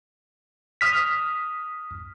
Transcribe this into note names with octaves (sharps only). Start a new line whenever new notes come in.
D#6 F6 B6